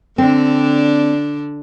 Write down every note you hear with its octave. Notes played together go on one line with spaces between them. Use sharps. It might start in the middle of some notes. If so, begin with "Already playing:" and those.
D3 C4 D4